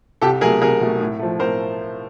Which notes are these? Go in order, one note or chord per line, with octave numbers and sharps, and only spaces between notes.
C2 G4 A4
B2 F#3 A3 G#4 A#4
C2 G#4 A#4
B2 F#3 A3
A2
F3 A3
A2 A#4 C5